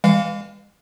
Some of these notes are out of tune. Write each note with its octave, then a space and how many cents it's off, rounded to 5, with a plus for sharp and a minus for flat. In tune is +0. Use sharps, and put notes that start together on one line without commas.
E3 +0 G#3 -40 F5 +0